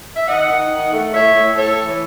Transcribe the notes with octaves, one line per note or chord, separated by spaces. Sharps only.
E5
D#3 D#5 F#5
D#3
D#3
A3
A2 C#5 E5
A2
A2 A4 C#5
E3